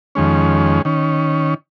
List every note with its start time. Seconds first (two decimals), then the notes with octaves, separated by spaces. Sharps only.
0.15 F2 D#3 G#3 C#4
0.85 D#3 C#4